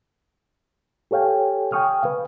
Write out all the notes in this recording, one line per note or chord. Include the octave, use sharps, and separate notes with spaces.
G4 A4 C#5 F5 G5 G#5
G5 G#5 C#6 D#6 F6
B4 F5